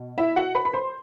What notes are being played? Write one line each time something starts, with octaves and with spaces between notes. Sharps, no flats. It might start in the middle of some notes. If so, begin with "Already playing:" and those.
Already playing: B2
E4 E5
F#4 F#5
B4 B5
B5
C5 C6